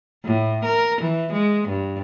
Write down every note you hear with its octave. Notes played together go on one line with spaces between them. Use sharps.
A2
A#4
E3
G#3
G2